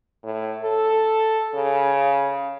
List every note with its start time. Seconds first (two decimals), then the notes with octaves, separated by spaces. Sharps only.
0.24 A2
0.63 A4
1.54 C#3